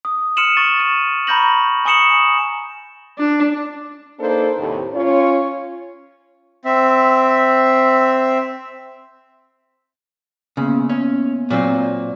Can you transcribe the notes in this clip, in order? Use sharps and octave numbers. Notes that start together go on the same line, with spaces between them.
D#6
C6 F6 C#7 D#7 E7 F#7
C#6 A6
D#7 E7
A#5 B5 C#6 G6 A#6 F#7
G#5 C#6 D#6 C#7 E7 F#7
D4
A#3 D4 D#4 A4 B4 C5
D#2 A2 C3
C#4 F4 C#5
C4 E5
C#3 A#3 B3
C#4
A#2 F#3 C4
D5